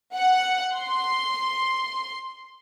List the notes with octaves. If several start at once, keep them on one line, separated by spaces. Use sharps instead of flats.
F#5
C6